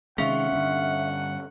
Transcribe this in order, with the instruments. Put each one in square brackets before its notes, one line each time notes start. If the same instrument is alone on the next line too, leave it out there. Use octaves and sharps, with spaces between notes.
[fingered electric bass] C3 D#3 G#3 [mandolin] C#4 F4 [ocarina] E5 [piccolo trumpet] F#5
[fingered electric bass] G2 D3